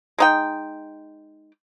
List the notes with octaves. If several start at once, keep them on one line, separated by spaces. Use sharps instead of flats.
G#3 D#4 G5